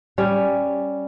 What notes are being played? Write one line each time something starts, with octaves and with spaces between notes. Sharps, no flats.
G3 C#4